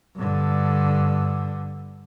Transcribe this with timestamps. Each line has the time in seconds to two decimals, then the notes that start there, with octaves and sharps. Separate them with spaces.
0.16 G2 D3